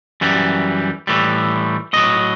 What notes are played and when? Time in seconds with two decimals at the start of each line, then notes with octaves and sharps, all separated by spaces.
0.21 F#2 E3 G3
1.07 A2 E3 G3
1.93 A2 F#3 D#5